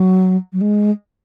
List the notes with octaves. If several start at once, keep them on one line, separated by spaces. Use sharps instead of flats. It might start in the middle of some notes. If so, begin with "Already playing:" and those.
Already playing: F#3
F#3
G#3